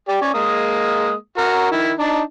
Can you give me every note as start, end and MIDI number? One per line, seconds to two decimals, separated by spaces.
0.08 0.17 67
0.08 0.17 74
0.21 0.30 61
0.21 0.30 74
0.34 1.13 56
0.34 1.13 58
0.34 1.13 87
1.38 1.71 66
1.38 1.71 70
1.72 1.92 51
1.72 1.92 64
1.99 2.21 62
1.99 2.21 63